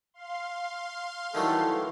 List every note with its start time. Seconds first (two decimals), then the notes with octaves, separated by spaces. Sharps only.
0.14 F5 C6
1.35 D#3 E3 F#3 G3 A3 A4